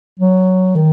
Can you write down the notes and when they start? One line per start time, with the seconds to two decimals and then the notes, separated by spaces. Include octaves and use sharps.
0.19 F#3
0.76 D#3